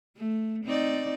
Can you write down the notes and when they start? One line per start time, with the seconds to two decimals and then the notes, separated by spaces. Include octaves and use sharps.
0.17 A3
0.65 C4 D#4 D5